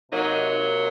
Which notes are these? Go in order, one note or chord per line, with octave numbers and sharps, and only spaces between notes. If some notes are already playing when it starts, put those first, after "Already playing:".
C3 F#3 A#3 D#4